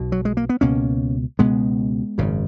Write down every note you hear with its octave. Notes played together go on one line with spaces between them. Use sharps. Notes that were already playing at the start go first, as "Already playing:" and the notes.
Already playing: B1 B2
F#3
G#3
A#3
B3
C#2 B2 A#3 C#4
C#2 B2 G#3 B3
G#1 F#2 C#3